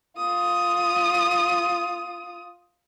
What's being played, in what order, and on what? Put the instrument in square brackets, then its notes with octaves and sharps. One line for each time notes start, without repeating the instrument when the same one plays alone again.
[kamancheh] F4 D#6